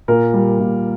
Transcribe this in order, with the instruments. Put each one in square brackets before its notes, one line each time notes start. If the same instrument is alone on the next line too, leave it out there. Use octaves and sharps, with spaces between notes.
[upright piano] A#2 A#4
G3
A#2